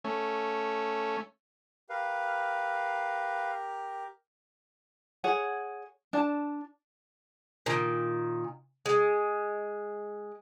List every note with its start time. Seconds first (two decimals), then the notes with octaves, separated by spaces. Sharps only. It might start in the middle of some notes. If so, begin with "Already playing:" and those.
0.04 A3 C#4
1.90 G4 A#4 B4 F5
5.24 G#4 C#5 F#5
6.13 D4 A5
7.66 A#2 D#3
8.86 G#3